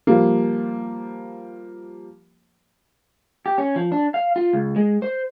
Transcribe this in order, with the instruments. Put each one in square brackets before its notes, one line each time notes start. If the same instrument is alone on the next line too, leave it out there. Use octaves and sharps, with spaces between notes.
[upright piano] F3 G3 A#3
[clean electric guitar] G4
C#4
F3
D4
F5
F4
C#2
G#3
C5